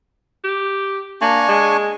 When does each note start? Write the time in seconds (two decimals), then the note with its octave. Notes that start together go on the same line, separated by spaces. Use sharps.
0.44 G4
1.21 A#3 D4 G#5 C#6
1.49 G#3